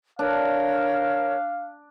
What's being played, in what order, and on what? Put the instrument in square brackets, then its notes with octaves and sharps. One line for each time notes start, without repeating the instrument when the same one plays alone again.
[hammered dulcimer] D4 [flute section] A#4 C#5 [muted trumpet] F5